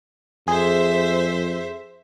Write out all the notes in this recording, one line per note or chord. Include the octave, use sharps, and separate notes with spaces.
F2 G#4 C5 E5